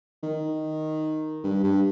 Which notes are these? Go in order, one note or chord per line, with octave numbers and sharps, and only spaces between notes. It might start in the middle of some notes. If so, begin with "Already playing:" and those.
D#3
G2
G2